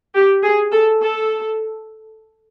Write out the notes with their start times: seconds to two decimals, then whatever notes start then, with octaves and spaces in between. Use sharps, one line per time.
0.15 G4
0.43 G#4
0.72 A4
1.00 A4